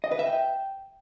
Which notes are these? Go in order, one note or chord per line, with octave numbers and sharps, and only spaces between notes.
D#5
B4
E5
G5